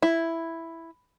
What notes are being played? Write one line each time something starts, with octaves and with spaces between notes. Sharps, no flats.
E4